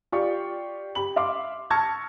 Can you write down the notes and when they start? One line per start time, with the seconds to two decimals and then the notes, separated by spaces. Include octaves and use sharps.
0.12 F4 G4 D5 G5 C#6
0.95 G4 B5 F#7
1.16 E5 F5 C6 D6
1.70 A5 C#6 E6 F6 G#6 A#6